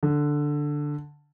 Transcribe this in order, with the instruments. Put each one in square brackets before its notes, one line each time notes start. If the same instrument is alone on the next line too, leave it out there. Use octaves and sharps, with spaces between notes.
[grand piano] D3